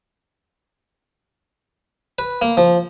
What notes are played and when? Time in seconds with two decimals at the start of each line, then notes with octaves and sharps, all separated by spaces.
2.19 B4
2.42 A#3
2.57 F3